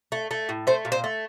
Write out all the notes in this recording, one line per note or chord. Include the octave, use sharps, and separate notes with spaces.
A3
A3
A2
A3 C5
A#2
C5
A3